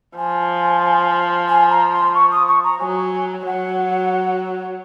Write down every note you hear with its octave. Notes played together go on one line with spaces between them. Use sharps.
F3 G#5
G#5
A#5
C6
C#6
D#6
C#6
A#5
F#3 G#5
F#3 F#5